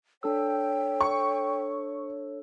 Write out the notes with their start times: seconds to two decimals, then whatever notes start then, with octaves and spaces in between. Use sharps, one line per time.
0.23 D4 A4 C#5 G5 E6
1.01 C#6